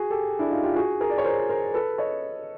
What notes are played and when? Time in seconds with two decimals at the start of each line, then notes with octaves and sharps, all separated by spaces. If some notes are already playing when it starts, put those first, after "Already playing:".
Already playing: F#4 G#4
0.10 G4 A4
0.39 D4 E4
0.51 D#4 F4
0.64 F4 G4
0.76 F#4 G#4
1.01 G#4 A#4
1.10 D5
1.18 C#5
1.25 A#4 C5
1.49 A#4 C5
1.74 A4 B4
1.98 C#5 D#5